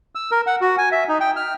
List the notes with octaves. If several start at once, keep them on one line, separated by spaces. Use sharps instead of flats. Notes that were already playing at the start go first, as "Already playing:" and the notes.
E6
A#4
F#5
F#4
G#5
E5
D#4
G5
F6